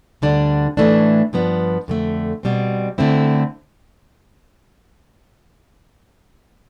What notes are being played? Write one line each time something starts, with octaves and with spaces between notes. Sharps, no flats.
D2 D3 G3 D4
A2 E3 A3 D4
G2 F3 B3 D4
F2 D3 A3
B2 G3 C4
D3 A3 C4 E4